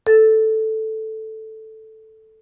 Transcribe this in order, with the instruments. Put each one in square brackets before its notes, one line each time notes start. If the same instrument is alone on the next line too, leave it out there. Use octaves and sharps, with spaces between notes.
[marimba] A4 A6